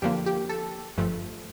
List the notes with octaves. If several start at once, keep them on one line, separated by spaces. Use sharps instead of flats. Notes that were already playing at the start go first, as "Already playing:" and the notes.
F2 D3 F3 A#3 G4
G4
A4
G1 G2 F3 A3